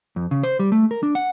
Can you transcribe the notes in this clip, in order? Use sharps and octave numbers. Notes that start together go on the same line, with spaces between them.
F2
C#3
C5
G3
A3
A#4
D4
F#5